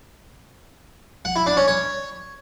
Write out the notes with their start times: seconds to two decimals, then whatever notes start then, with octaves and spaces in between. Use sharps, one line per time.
1.25 F#5
1.36 E4
1.46 D4
1.57 C#4
1.68 C#5